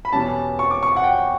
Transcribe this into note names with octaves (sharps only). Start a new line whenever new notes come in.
B5
E2 B2 G3 C#4 A5
C#6
D6
C#6
F#5
G5